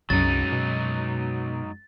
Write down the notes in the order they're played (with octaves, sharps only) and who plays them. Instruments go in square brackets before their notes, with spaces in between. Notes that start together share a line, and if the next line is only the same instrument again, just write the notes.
[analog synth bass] C2 [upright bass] F#2 G#3 [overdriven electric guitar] F#3 D#4 [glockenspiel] A6
[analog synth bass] B2